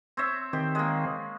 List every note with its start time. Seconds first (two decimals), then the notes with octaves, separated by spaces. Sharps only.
0.17 C4 C#5 E5
0.53 D#3 C4 G4
0.75 G#3 A#3